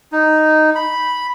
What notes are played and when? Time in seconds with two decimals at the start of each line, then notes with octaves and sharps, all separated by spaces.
0.12 D#4
0.75 B5